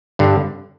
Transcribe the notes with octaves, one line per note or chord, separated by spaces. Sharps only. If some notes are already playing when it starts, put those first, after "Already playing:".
G2 D3